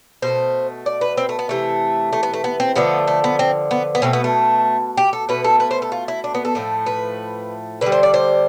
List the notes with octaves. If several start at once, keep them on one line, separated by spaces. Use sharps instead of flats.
B2 A3 C5
D5
B4
C4
A3
B3
C3 E3 A3
A3
B3
A3
B3
C4
D3 F3 A3 B3
A3
B3
C4
B3
B3
B2 A3 C4
B3
A3
G4
A4
B2 A3 B4
A4
B4
C5
A4
F4
E4
D4
B3
A4
A2 F3 A3
B4
D3 G3 B4
C5
D5
C5